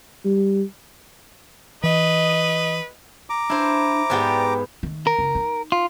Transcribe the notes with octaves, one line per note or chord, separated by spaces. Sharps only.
G3
E3 B4 D#5
A#5 D6
D4 E4 C5
G#2 B3 G4 C5 D5 G5
D#3 A3
A#4
F#1
D#4
F4